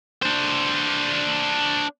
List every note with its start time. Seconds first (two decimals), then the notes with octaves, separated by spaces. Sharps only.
0.22 D4 C5